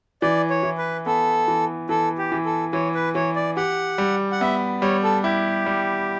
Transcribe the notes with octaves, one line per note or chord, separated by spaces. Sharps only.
E3 D5
C#5
E3
B4
B3 A4
E3
E3 A4
G4
E3
A4
E3 C#5
B4
E3 C#5
D5
G4 F#5
G3
F#5
B3 E5
G3 C#5
A4
E4 G4
G3